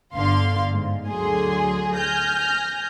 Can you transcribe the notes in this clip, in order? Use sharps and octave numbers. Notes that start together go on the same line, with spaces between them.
G1 D3 F5 C6
G#2
D2 D3 F#3 G#4 C6
G#5 F6 G6 A#6